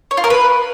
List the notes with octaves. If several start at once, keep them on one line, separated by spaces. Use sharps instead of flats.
C#5
F4
A#4
B4